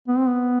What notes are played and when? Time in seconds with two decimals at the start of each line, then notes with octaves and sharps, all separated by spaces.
0.08 B3
0.18 C4
0.28 B3